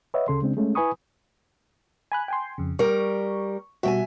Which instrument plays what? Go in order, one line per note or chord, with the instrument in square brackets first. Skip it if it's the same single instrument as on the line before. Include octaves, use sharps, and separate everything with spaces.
[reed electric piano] B4 C#5 D#5 E5 F#5
D2 C#3 A4 C6
C#3 G#3 C4 D4
G#3 A3 C#4
E4 B4 G#5 B5 C#6 D#6
[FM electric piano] G#5 B5 F#6
G5 G#5 C6
F2 C#3
[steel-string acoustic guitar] G3 A#4 [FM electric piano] C#6
[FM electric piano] B2 G3 F#4 [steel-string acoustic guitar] E5 G5 G#5